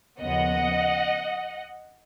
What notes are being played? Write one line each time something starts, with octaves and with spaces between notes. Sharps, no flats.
D#2 C#3 F3 B3 D#5 F#5